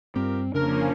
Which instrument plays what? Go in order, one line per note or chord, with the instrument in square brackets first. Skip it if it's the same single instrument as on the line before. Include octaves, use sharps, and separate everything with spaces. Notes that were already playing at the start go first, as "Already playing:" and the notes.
[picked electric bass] G2 [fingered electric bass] C4 [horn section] F4 G4 A#4
[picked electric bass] F1 C#3 [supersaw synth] F3 A#3 C#4 [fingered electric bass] D4 [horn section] A#4